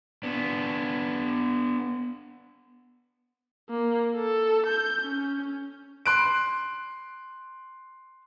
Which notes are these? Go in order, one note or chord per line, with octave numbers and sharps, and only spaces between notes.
B3 D4
A#3
A4
G6
C#4
C6 F#6 D7